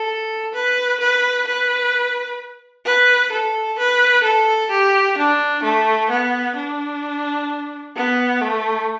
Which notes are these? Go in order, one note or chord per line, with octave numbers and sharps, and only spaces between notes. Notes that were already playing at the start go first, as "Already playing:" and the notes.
Already playing: A4
B4
B4
B4
B4
A4
B4
A4
G4
D4
A3
B3
D4
B3
A3